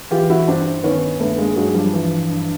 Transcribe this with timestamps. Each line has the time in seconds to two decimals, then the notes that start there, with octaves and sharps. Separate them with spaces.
0.11 E3 F4 G4
0.30 E4 F#4
0.47 G2 C4 D4
0.83 D#3 B3 C#4
1.20 G2 A3 B3
1.38 G#3 A#3
1.56 G2 F#3 G#3
1.75 F3 G3
1.93 E3 F3
2.30 G2